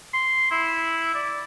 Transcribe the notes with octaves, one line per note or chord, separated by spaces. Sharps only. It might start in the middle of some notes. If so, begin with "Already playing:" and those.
C6
E4
D5